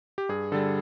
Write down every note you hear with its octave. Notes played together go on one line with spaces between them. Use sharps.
G4
G2 G#4
D3 G3 A4